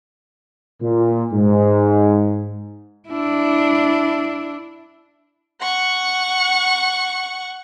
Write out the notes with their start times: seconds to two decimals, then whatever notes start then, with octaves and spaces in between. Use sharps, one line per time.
0.82 A#2
1.33 G#2
3.09 D4 E4
5.61 F#5 C#6